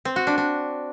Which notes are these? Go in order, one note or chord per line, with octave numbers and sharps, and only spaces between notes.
C4
F#4
D4
D4